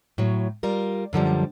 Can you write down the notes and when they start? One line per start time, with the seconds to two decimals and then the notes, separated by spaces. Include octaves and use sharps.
0.18 A2 F#3
0.63 G3 F4 A#4
1.13 F#2 D3 F3 G3